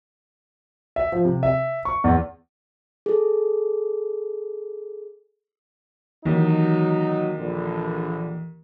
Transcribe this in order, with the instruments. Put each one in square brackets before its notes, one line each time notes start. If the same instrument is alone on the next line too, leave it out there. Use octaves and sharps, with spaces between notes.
[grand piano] E5
F3
C3
E5
C#6
E2
[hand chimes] G#4 A4
[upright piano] D#2 [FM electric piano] E3 [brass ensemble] F#3 D#4
[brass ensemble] A#1 D3